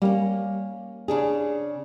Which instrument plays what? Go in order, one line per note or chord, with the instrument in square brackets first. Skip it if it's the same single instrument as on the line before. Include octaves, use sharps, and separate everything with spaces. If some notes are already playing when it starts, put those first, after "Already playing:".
[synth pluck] G3 [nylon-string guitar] A#3 C#4
[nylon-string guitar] C#3 D4 G#4